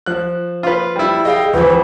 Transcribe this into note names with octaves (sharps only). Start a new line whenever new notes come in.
F3 F#6
F4 B4
G3 E4
G#4 D#5 F5 G5
C#2 E3 F3 B4